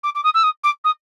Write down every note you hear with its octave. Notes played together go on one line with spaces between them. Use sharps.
D6
D6
D#6
E6
D#6
D6
D#6